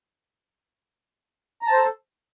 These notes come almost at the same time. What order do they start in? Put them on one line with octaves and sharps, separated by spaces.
A#5 A5 C5 A4